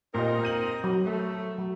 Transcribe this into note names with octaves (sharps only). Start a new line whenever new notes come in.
A#2 C4 D#4 G4 A#4 D#5
G6 D#7 F#7
F#3
A3
F#3